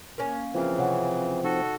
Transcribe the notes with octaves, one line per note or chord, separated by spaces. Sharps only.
A#3 C#4
C#3 E3 F3 C4 F4 A#4 F5
C3 C#5 F#5
D#4 F#4 A4